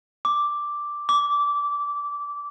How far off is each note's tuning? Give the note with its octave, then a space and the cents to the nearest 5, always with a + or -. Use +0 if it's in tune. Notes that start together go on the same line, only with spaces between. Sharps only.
D6 +0
D6 -20